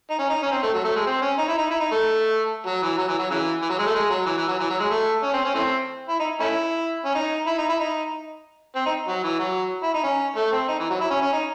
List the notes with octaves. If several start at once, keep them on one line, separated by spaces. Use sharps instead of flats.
D#4
C#4
D#4
C#4
C4
A3
F#3
A3
G#3
C4
C#4
D#4
E4
D#4
E4
D#4
A3
F#3
E3
F#3
E3
F#3
C#3 E3
E3
F#3
G#3
A3
G#3
F#3
E3
E3
F#3
E3
F#3
G#3
A3
C#4
C4
C#4
E3 A3 C4
E4
D#4
A3 C#4 E4
C#4
D#4
E4
D#4
E4
D#4
C4
D#4
F#3
E3
F#3
E4
D#4
C#4
A3
C4
D#4
E3
F#3
E4
C#4
C#4
D#4